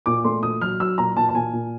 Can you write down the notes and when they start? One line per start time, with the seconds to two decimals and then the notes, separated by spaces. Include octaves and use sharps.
0.06 A#2 D6
0.25 A3 C6
0.43 A#2 D#6
0.61 F#3 F6
0.80 F#3 E6
0.98 A#2 A#5
1.17 A#2 A5
1.29 A5
1.35 A#2 G#5
1.53 A#2